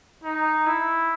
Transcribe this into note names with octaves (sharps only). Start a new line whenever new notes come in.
D#4
E4